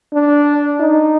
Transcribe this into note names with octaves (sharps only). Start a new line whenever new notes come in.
D4
D#4